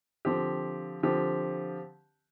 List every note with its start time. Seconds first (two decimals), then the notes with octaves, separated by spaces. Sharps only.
0.25 D3 F3 C4 G4
1.03 D3 F3 C4 G4